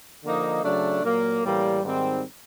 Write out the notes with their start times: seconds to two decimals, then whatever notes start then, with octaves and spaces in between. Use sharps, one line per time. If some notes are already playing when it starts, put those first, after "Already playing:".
0.24 D3 F3 A#3 D#4
0.64 C#3 F#3 A3 D4
1.03 A#2 F#3 A#3
1.42 A2 E3 G3 A#3
1.83 G#2 D#3 G3 C4